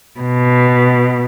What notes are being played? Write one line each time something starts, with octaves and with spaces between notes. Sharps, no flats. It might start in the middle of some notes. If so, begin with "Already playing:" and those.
B2